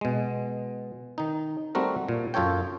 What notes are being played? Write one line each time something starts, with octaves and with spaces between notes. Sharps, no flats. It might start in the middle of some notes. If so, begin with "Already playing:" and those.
B2 G#3
D#3 D#4
G3 A3 C4 F#4 A#4
A#2
F#2 F4 A4 C#5 G5